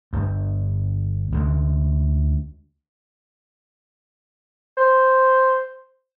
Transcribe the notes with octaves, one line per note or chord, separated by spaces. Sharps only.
G1 G2
D2 D3 G#3
C5